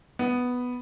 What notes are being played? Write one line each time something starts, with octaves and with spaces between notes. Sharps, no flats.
B3